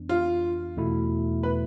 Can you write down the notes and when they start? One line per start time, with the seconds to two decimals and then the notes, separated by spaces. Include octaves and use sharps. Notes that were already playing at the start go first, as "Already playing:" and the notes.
Already playing: F2 E3 B3 D4
0.09 F4
0.77 E2 B2 A3 E4
1.43 B4